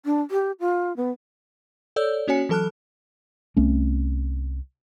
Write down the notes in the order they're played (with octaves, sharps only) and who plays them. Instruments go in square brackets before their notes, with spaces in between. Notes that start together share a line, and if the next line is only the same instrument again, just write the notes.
[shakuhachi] D4
G4
F4
B3
[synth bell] A4 C#5 D5 E6 G6
A#3 C#4 F#4 C#5 G#5 C#7
E3 F#3 A4 A5 F6 F#6
[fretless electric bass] C2 A3 C4 C#4